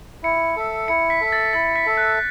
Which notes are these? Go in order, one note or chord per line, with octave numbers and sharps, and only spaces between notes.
E4 C#7
A4 E5
E4 C#7
B6
A4 E5
A6
E4 A6
B6
A4 E5
F#6